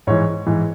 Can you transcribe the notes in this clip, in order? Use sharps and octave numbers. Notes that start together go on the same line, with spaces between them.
G#2 E3 C#5
G#2 E3